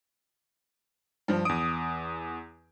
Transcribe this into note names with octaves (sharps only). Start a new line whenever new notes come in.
G2 F3
E2 D#6 D7